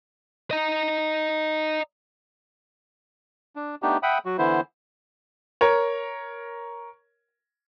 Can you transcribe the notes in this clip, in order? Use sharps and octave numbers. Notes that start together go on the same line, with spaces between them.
D#5 A#5
D4
A3 B3 D4 D#4 G4
E5 F#5 G5 B5 D#6
F#3 F#4
D3 E3 B3 E4 C5
A#4 C#5